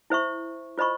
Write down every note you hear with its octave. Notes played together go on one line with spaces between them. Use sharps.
E4 C5 E5 C#6
F4 C5 D#5 B5 C#6